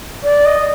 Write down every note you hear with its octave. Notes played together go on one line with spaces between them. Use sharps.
D5
D#5